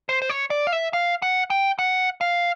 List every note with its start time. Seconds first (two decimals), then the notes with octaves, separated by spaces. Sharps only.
0.09 C5
0.22 C5
0.30 C#5
0.50 D5
0.67 F5
0.72 E5
0.93 F5
1.22 F#5
1.50 G5
1.79 F#5
2.21 F5